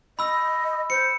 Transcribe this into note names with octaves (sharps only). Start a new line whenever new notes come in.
D#5 B5 E6
C5 C#7